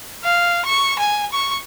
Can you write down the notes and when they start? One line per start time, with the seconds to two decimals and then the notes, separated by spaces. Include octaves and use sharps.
0.24 F5
0.65 C#6
0.99 G#5
1.32 C#6